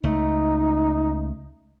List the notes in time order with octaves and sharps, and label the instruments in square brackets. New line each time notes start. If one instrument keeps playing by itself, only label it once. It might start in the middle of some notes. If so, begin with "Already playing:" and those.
[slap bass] C#2 A3 [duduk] D#4